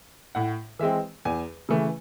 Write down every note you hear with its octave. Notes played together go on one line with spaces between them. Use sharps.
A2 F#5
E3 G#3 C4 E5
E2 G#5
C#3 E3 A3